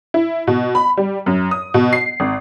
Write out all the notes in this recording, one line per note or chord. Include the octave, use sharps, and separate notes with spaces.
E4
B2
B5
G3
F#2
D#6
B2
C7
G#1